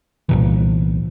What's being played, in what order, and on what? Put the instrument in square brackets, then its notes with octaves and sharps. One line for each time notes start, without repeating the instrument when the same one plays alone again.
[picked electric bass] C2 A#2 E3